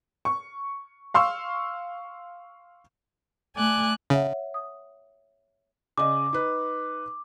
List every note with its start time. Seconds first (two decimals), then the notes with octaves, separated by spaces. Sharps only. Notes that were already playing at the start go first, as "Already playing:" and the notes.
0.25 C#6
1.14 F5 C6 C#6 E6
3.56 A3 D5 G#5 F#6
4.10 C#3 C#5 E5 F#5
4.54 D#6
5.98 C#3 D5 D#5 D6
6.33 D#4 B4